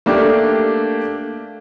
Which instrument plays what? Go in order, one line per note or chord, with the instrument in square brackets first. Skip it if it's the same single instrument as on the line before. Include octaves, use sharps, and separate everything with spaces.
[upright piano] A3 A#3 D4 G4